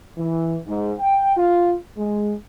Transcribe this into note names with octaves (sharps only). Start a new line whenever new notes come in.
E3
G#2
G5
F4
G#3